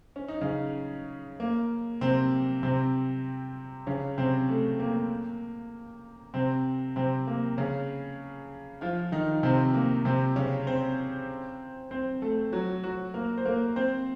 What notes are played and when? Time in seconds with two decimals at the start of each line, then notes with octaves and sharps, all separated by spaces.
0.16 C#4
0.28 D#4
0.41 C#3 C#4
1.40 A#3
2.01 C3 C4
2.63 C3 C4
3.87 C#3 C#4
4.18 C3 C4
4.49 A3
4.79 A#3
6.34 C3 C4
6.96 C3 C4
7.27 A#3
7.57 C#3 C#4
8.81 F3 F4
9.12 D#3 D#4
9.43 C3 C4
9.74 A#3
10.05 C3 C4
10.36 C#3 C#4
10.67 C4 C5
11.91 C4 C5
12.22 A3 A4
12.53 F#3 F#4
12.83 F#3 F#4
13.14 A#3 A#4
13.38 C5
13.45 A#3 A#4
13.76 C4 C5